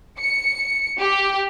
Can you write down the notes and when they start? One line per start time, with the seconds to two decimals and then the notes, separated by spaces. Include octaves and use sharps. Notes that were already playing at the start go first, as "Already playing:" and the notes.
0.20 C#7
0.99 G4